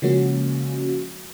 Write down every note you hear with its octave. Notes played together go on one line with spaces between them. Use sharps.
C#3 F3 G#3 A#3 C#4 F#4